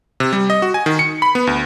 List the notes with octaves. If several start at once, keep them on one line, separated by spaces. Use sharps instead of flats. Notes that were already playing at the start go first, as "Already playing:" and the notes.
C3
G3
D#5
F#4
G#5
D#3
C#7
B5
B3
D2